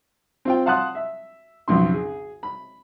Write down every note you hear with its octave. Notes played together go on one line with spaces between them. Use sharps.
C4 F4 G5
F5 F#5 A5 C6 D#6 F#6
E5
B1 F2 C#3 C6
G#4
B5